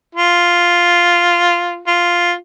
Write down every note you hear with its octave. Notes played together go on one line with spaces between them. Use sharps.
F4
F4